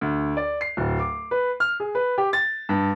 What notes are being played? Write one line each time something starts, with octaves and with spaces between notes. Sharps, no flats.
D2
D5
C7
D1
D6
B4
F6
G#4
B4
G4
A6
G2